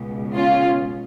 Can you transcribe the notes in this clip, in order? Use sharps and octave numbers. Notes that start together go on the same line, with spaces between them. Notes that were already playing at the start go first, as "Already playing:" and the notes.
Already playing: C#2 B2
C#4 F4